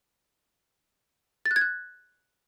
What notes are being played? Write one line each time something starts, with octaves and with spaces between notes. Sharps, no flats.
A6
F#6
G#6
F#6